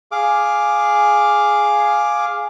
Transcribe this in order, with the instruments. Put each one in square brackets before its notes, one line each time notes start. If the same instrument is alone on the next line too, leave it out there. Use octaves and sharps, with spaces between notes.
[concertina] G#4 F5 D6